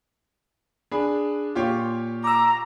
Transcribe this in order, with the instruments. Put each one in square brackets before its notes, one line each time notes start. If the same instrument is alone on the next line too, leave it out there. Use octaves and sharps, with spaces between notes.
[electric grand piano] D4 B5 [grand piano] G#4
[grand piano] A#2 [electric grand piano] F4 G4 C#5
[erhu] A#5 [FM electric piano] D6 E6